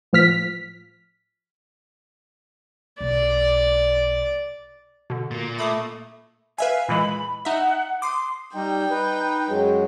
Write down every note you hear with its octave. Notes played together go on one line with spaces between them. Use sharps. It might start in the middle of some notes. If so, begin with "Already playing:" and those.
A2 F3 F6 B6
B1 D5
B2 D3
A#2 A#3
A3 B5 D6 D#6
B4 E5 F5 G#5
A#2 E3 G#3 B5
D#4 E5 F#5
C6 D6 D#6 C7
G3 D#4 G5
D#4 B4
F#2 F#3 G#3